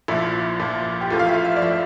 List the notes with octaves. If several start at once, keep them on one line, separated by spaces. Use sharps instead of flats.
A#1 A#2 F3 E4
A#1 A#2 F3
G4
A1 A2 F3 F4
F5
E5
E5
D5
A2 F3 E5